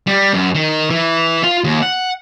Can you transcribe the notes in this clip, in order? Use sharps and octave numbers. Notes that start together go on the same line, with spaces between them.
G3
F#2
D#3
E3
F4
D#2
F#5